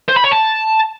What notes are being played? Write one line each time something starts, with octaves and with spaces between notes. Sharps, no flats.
C5
B5
C#5
A5